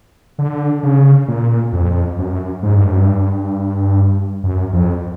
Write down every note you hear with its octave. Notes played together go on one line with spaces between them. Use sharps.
D3
C#3
A#2
F2
F#2
G#2
G2
F#2
G2
F#2
F2